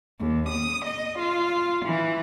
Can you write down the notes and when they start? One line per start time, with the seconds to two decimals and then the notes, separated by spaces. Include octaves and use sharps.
0.19 D#2
0.48 D#6
0.85 D#5
1.18 F4
1.85 E3